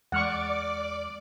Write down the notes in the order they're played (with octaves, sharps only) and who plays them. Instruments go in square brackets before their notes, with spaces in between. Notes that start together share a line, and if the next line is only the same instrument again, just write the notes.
[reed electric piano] E2 G#3 F6 [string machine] D5 D6 [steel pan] F#5 C#6